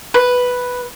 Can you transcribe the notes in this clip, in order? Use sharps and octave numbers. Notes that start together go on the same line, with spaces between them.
B4